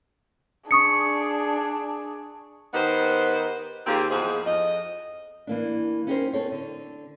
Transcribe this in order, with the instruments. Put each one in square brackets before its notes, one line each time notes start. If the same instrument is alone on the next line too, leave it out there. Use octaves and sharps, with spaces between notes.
[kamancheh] D4 G#4 [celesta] C#6 D#6 C#7
[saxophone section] D#3 B3 D#4 G4 C5
D#2 C4 F4 G4 G#4
E2 G#2 F3 G#4
F2 D#5
[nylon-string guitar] E3 A#3 D4
C#4 D#4 G4 G#4 A#4 C5
C4 A4 C#5
D3